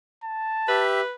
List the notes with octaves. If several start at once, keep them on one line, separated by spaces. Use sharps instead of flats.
A5
G4 B4 E5